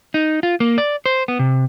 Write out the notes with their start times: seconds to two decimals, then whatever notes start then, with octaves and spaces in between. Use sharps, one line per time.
0.14 D#4
0.43 F4
0.60 A#3
0.78 D5
1.06 C5
1.28 B3
1.39 C3